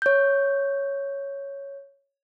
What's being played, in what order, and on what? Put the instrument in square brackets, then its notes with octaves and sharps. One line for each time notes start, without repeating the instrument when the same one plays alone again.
[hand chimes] C#5 G6